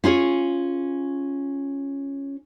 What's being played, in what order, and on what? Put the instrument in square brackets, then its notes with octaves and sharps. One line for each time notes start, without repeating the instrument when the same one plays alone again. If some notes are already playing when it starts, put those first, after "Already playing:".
[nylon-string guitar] C#4 F4 G#4 C#5